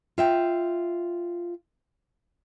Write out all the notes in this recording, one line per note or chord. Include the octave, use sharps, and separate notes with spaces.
F4 E5 G5